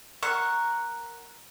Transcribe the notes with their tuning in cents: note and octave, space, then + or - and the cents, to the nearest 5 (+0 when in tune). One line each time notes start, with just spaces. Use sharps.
A#4 +0 F#5 +0 C#6 -5